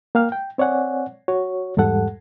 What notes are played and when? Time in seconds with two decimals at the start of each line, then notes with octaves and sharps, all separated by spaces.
0.15 A#3 F5 G5 F6
0.32 G5
0.58 C4 C#5 D5 F#5 G#5
1.28 F#4 C#5
1.77 E2 G#2 G3 A4 F#5